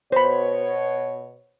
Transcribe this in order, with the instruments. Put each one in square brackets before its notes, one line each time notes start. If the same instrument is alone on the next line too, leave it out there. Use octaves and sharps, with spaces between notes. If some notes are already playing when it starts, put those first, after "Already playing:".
[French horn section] B2 C#5 [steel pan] C5 B5